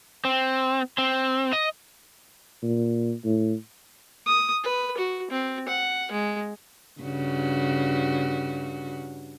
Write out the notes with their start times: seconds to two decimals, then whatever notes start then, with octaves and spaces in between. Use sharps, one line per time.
0.25 C4
0.98 C4
1.53 D#5
2.63 A#2
3.25 A2
4.26 D#6
4.64 B4
4.98 F#4
5.30 C4
5.68 F#5
6.11 G#3
7.01 G2 C#3 F#4